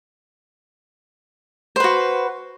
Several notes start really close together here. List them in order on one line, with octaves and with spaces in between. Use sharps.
C5 B4 F#4